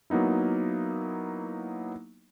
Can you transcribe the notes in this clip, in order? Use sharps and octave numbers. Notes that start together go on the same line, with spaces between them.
F#3 A#3 B3 D#4 E4